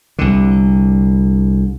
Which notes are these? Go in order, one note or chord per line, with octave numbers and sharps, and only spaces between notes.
C2 D3